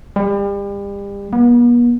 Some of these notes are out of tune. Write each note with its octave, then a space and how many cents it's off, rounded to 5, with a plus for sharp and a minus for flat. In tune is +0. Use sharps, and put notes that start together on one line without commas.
G3 +35
B3 -45